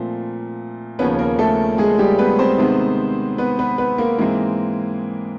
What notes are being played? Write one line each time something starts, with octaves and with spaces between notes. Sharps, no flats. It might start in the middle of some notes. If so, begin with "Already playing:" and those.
Already playing: A#2 F3 A3 C4
D#2 C#3 F3 A#3 B3 C#4 B4
A#3 A#4
A3 A4
G#3 G#4
G3 G4
B3 B4
C4 C5
C3 D#3 G#3 B3
B3 B4
B3 B4
B3 B4
A#3 A#4
G#2 E3 G#3 A#3 C4 A#4